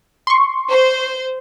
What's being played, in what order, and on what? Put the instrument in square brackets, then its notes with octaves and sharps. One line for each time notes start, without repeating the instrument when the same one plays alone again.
[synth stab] C6 C#6
[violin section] C5